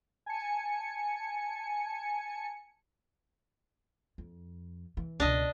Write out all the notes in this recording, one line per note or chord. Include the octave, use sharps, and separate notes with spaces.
G#5 A5 C#7
F2
E3
C#2 B2 D4 D#5